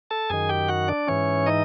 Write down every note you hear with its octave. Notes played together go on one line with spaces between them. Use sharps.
A4 A5
F#2 D#3 G#4 G#5
G4 G5
F#4 F#5
D4 D5
G#2 E3 C#4 C#5
D#4 D#5